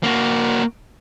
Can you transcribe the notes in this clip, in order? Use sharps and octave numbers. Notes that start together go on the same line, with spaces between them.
A#3 F#4